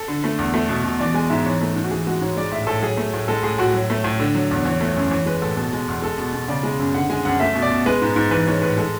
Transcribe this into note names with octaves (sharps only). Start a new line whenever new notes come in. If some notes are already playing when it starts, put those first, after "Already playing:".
Already playing: A4
D3
A3
E2
A3
B2
B2
E3 D5
G#3 G#5
G#2 E5
E3 C#5
A3
G#2
F#4
E3 G#4
G#3 F#4
G#2 C#5
G#3 D5
A2 E5
A2 A4
F#3 G#4
A3
A2
G#3 A4
A2 G#4
A2 F#4
F#3
A3
A2
D3
F#3
E2
E3 C#5
A3
C#5
F#2
E3 C#5
G#3 B4
A2 A4
B2 A4
G#3
E2
G#3 A4
B2
B2
C#3 D5
G#3
F#2
D3 F#5
G#3 G#5
F#2 F#5
A3 E5
B2
D5
B2
G#3 B4
G#2
G#2
E3 B4
G#3 C#5
A2 B4
G#3 A4